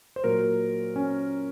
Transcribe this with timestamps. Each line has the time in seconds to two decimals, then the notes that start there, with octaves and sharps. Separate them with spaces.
0.16 C5
0.24 A#2 F#3 A#4
0.96 C#4